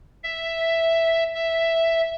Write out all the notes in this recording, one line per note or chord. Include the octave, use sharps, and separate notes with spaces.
E5
E5